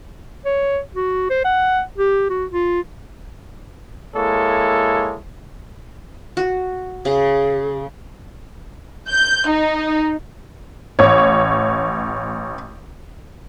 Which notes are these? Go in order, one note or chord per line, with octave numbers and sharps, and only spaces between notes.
C#5
F#4
C5
F#5
G4
F#4
F4
G#3 A#3 E4 A4 C#5
F#4
C#3 G#4
G6
D#4
A1 C#5